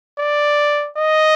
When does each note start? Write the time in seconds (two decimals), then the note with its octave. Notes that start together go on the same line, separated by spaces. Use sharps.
0.20 D5
0.97 D#5